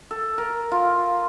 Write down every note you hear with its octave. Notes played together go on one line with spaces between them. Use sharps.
A4
A#4
F4